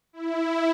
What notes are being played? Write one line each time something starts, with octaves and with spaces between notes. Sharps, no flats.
E4